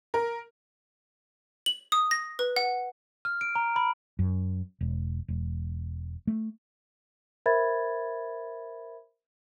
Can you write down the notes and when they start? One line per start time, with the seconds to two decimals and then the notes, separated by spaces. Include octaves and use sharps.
0.14 A#4
1.66 F#7
1.92 D#6
2.11 A#6
2.39 B4
2.56 F#5
3.25 F6
3.41 D7
3.55 A#5
3.76 B5
4.19 F#2
4.81 E1
5.28 E1
6.27 A3
7.46 A#4 C5 E5 B5 G#6 A6